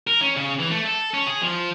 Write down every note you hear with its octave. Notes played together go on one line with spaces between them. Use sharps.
A#4
C#4
C#3
E3
A3
A4
C#4
G#4
F3